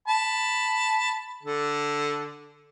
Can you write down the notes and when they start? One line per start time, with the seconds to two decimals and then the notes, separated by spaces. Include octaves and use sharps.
0.08 A5 B5
1.43 D3 A4